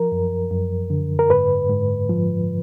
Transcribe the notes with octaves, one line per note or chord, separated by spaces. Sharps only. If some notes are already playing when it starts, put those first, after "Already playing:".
Already playing: F3 A#4
F#2
F#2
D3
A#4
G#2 B4
G#2
F3